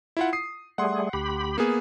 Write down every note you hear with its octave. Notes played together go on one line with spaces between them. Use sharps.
E4 F4 F#5
D#6 C7
G3 A3 G#4 F#5 C6
D2 G4 B5
A#3 B3 G#4